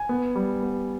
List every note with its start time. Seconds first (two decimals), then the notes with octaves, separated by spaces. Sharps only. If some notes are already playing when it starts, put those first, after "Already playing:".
Already playing: G#5
0.09 B3
0.35 G3
0.63 B3